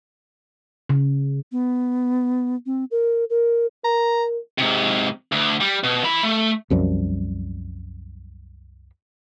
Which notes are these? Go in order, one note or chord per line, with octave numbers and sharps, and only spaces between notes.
C#3
B3
C4
A#4
A#4
A#4 A#5
G#2 C3
D2
G3
B2
E3 B5
A3
C2 F#2 F3 G3